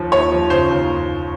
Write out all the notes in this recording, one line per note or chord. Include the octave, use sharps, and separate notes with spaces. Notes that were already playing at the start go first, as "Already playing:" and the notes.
Already playing: D#2 F3
D#2 C#5
F3
C#3 C5
D#2